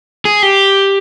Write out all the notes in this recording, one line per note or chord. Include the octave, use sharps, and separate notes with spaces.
G#4
G4